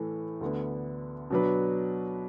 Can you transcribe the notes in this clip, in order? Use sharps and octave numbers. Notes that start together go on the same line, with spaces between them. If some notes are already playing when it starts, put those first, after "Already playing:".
Already playing: A2 E3 A3
D2 D3 B3
B2 F#3 D4 B4